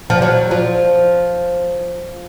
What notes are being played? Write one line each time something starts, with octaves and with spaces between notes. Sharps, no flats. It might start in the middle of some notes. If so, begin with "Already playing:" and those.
F3
F#3
F3